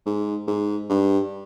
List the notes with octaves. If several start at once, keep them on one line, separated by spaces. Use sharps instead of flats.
G#2
G#2
G2